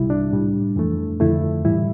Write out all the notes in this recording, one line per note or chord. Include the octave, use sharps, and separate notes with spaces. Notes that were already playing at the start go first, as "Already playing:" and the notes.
Already playing: C2 C3 G3 E4
D4
A2 G3
F2 E3 A3
F2 D3 A3 E4
A2 E3 G3 E4